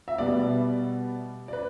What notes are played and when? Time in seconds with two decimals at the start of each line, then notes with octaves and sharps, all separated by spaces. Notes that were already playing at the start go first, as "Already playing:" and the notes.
0.08 E5
0.18 B2 G3 B3 D5
1.48 D5
1.53 B4